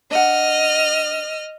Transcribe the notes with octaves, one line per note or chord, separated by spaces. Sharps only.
D4 D#5 F#5 F6